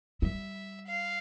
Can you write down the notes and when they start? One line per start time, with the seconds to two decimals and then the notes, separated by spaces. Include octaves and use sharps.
0.22 G3 E5
0.86 F5